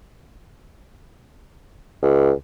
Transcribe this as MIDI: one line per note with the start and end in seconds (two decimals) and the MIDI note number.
2.02 2.31 37